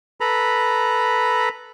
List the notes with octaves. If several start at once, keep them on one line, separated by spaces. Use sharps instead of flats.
A4 B4 A#5 B5